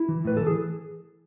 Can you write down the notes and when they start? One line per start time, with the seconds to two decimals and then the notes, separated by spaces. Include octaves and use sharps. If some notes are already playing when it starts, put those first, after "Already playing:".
Already playing: E4
0.09 E3
0.25 A2 B4
0.37 E3 A4
0.47 G#4